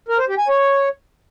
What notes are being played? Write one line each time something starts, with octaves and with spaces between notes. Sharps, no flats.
A#4
C5
G4
G#5
C#5